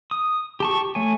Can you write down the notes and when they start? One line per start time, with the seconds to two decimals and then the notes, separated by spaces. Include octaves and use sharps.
0.11 D#6
0.60 G4 A5 C#6
0.95 A3 C#5 G#5